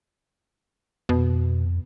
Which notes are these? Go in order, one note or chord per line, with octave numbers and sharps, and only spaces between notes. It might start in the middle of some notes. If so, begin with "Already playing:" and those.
F2 B2